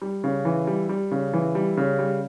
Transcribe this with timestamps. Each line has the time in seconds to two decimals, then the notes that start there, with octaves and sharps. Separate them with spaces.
0.02 G3
0.24 C#3
0.45 E3
0.67 G3
0.89 G3
1.11 C#3
1.33 E3
1.55 G3
1.77 C#3
1.99 G3